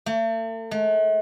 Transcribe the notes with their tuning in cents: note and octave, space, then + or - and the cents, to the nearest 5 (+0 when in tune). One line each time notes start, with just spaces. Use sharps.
A3 +40
A3 -45